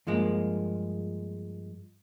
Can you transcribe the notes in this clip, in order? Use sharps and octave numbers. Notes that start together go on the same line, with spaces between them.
G2 F3 G#3 A#3